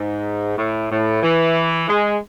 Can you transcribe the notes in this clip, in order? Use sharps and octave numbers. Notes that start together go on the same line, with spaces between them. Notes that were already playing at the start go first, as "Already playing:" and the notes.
Already playing: G#2
A2
A2
E3
G#3